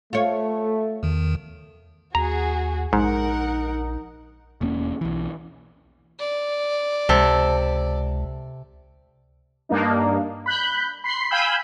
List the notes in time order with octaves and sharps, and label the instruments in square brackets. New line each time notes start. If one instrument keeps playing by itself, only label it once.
[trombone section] A3 [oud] F4 C#5
[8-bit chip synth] E2 D#3
[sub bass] D#2 [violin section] F#4 G#4 [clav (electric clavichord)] A#5
[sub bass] A#1 [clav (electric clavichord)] G#2 [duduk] D#4 [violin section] A#4 F#5
[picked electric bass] E1 E2 A#3 C#4
B1 E3
[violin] D5
[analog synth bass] C#2 [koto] C3 A4
[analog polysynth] G2 A#3 D4 D#4
B5 F#6 G6
B5 C6 C7
F5 G5 G#5 B5 E6 G6